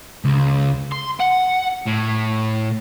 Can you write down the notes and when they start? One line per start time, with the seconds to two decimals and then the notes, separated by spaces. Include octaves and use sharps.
0.25 C#2
0.92 C6
1.20 F#5
1.86 A2